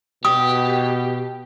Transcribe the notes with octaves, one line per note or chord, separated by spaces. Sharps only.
B2 G4 D#6